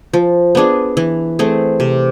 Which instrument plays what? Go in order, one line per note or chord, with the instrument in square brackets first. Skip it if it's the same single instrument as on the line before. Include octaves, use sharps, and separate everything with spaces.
[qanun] F3
B3 D4 G#4
E3
A3 C4 G#4
C3